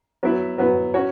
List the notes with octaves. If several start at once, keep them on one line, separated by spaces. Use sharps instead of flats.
F#3 B3 E4 B4
F#3 B3 E4 B4
C#4 F#4 C#5